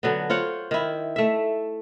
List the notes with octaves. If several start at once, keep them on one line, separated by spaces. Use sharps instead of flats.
D3 F#3 B3
F4 C5 C#5 F#5
D#3 E4
A3 E5